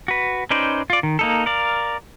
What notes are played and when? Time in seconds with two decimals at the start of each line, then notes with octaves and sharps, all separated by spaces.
0.08 F#4 B4
0.51 C#4 D#4 B4 C5 D5
0.90 F4 D5
1.03 D#3
1.19 A#3 D#4 A4
1.46 A#4 D5 F5